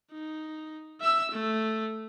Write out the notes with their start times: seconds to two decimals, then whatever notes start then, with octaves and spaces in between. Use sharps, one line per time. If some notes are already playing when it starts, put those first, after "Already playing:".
0.12 D#4
1.01 E5 E6
1.31 A3